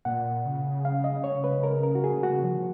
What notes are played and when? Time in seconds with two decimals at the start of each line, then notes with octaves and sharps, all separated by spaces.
0.05 A#2 F#5
0.45 C#3
0.85 F5
1.04 D#5
1.24 C#5
1.44 B4
1.63 A#4
1.83 A#4
1.95 F#4
2.04 G#4
2.23 F#4
2.43 F3